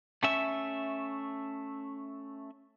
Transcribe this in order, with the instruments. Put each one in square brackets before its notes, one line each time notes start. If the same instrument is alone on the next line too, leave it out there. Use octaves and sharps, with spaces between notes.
[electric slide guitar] A3 C#4 E5